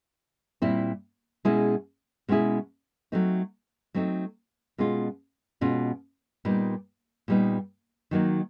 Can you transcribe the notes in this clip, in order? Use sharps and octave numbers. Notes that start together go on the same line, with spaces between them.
A#2 G3 C4 E4
B2 G#3 C#4 E4 G#4
B2 G#3 C#4 E4 G#4
F#3 A3 C4 D#4
F#3 A3 C4 D#4
B2 G#3 C#4 F4
B2 G#3 C#4 F4
A#2 G3 B3 D#4
A#2 G3 B3 D#4
D#3 F#3 A#3 D#4